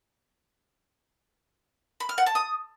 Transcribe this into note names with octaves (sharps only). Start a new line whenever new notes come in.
B5
F6
F#5
A5
D#6